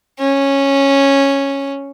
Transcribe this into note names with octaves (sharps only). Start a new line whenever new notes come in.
C#4